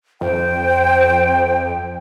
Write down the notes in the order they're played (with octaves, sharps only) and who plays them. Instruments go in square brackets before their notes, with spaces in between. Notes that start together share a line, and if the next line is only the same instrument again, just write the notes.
[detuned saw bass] F2 [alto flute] C5 [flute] G5